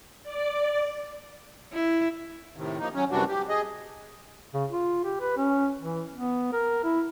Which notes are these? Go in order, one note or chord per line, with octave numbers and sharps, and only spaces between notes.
D5
E4
A2 C3 D#3
F3 A#3 D#4
F#3 C#4
F#2 C3 E3 G3 D4 F#4
G4
G#4 D#5
C#3
F4
G4
B4
C#4
E3
B3
A#4
E4